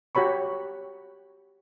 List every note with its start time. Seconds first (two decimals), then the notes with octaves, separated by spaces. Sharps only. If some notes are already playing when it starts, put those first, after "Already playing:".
0.15 F#4 G4 C#5 B5 C#6